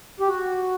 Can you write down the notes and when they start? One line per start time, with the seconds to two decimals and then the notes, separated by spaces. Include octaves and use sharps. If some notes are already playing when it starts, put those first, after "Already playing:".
0.20 G4
0.28 F#4